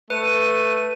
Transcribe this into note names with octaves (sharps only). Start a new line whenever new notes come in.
A3 B4 D#7